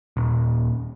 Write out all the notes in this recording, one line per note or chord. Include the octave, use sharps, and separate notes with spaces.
D#1